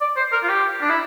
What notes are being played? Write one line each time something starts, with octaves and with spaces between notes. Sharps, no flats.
D5
C5
A#4
F4
G4
D4
E4